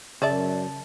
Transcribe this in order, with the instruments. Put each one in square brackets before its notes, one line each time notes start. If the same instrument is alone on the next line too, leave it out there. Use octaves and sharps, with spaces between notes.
[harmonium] F#2 [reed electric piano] C#3 A5 A6 [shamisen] G#4 D5 E5